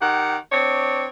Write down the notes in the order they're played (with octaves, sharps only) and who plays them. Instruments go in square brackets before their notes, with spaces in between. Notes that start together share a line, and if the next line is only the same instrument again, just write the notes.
[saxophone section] D#3 G4 F#5
C4 D4 C#5